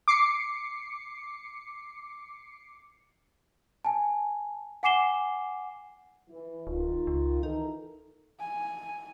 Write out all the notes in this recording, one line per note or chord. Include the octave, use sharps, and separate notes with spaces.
D6 C7 C#7
G#5 A5
F#5 G#5 D6 C7 E7 G7
E3
D1 D#3 F4
C#2
E3 D#4 A4 A#4
G#5